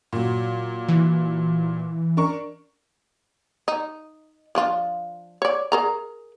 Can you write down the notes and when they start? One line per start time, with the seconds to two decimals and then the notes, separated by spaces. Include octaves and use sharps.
0.13 A#2 F#3
0.88 E3
2.17 D4 A#4 C#6
3.68 D#4
4.55 F3 D4 F4
5.42 C#5 D5
5.72 G#4 A#4 A#5